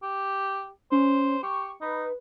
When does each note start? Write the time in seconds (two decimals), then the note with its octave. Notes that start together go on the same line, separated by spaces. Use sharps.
0.03 G4
0.92 C#4 C5
1.43 G4 C#6
1.81 D#4 B4